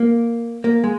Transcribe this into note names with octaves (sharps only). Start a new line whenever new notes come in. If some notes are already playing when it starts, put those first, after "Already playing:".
Already playing: A#3
A#3
G#3